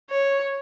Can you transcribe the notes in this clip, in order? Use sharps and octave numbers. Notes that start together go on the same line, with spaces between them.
C#5